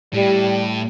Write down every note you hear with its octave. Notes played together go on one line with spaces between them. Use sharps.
A2 G3